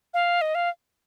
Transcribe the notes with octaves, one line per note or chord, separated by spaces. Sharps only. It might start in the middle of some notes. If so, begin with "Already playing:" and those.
F5
D#5
F5